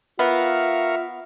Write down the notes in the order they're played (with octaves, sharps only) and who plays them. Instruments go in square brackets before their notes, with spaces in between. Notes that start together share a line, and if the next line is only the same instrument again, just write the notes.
[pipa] B3 [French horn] F4 [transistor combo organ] A#4 F5 C#6 [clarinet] E5